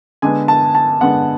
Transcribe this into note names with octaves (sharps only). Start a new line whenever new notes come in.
D3 G#3 B3 G#5
A5
A5
D3 G#3 B3 F#5